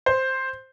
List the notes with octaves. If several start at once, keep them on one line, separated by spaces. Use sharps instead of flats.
C5